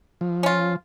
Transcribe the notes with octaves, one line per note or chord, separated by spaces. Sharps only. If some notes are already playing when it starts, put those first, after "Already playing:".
F3
C#4 F4